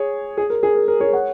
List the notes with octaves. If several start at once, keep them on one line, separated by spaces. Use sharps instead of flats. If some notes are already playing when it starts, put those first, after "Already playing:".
Already playing: G#4 C#5
G#4
A#4
G#4
A#4
A#4
G#4 C#5
C#5 F#5